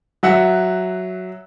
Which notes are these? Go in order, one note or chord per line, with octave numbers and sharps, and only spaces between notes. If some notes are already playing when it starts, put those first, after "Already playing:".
F#3 E5 F#5